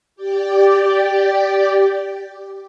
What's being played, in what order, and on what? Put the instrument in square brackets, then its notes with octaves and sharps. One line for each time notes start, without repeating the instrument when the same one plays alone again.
[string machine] G4 D5